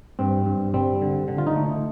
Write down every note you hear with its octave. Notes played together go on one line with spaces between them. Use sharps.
G2 C4
G2
G3 C4
D3
D3
F4
D#4
A3